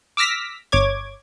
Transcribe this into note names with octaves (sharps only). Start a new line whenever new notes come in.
D6 E6 F6 A#6 B6
G1 C#5 D6 G#6